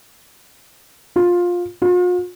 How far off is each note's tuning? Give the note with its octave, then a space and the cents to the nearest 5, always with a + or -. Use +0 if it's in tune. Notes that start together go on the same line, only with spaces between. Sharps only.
F4 +15
F4 +45